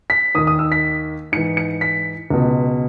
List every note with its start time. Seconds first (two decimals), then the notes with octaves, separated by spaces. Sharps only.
0.10 B6
0.35 D#2 D#6
0.38 D#3
0.47 D#6
0.59 E6
0.72 B6
1.32 G#2 C#7
1.37 E3
1.57 C#7
1.81 B6
2.30 C#2 B2